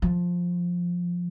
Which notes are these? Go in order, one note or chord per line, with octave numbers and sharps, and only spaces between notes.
F3